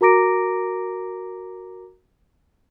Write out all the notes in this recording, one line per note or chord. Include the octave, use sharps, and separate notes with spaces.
F#4 A#4 A#5 D6 A#6 D7